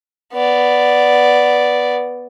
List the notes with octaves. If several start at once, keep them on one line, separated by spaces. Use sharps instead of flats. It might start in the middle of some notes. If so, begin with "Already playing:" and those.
B3 D5